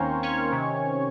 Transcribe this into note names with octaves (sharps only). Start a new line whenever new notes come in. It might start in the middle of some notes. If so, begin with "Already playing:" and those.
Already playing: D#2 D#3 A#3 C4 C#4 A#4 C5 C#5
C#4 C#5
C3 D#3